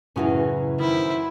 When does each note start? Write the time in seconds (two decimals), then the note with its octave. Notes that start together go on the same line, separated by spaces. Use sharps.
0.16 F#2 A2 C#3 E3 F#3 C#4
0.80 D#3 E4 C5